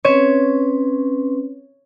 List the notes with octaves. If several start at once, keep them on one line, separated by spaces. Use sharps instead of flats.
C4 C#4 B4 C#5